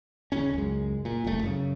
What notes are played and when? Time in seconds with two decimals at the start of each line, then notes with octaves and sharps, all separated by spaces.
0.32 D#1 G#1 C#3 C#4
0.54 C#2 F#2 G#3
1.05 A#2
1.24 F#1 C2 C3 A3
1.42 F#2 C#3